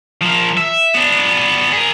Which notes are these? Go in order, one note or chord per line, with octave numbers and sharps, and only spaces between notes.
F3 A#4
E5
B3 D4
G#4 A#4